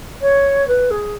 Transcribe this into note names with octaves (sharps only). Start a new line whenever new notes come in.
C#5
B4
G#4